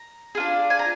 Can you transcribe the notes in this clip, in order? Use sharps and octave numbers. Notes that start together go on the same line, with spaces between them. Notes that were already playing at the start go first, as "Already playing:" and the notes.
Already playing: A#5
G#4
D4 F4
G#5
A#5